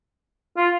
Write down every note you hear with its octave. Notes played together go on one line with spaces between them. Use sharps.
F4